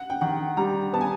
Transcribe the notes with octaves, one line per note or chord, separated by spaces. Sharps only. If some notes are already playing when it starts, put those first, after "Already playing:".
Already playing: F#5
G5
D#3 F#5
G3 A#5
B3 A5
G#5